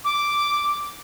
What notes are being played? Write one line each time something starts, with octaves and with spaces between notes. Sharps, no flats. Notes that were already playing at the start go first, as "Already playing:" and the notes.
D6